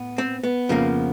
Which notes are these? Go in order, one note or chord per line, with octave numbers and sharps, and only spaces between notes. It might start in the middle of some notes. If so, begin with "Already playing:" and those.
Already playing: A2 B3
C4
B3
F2 C#3 F3 A#3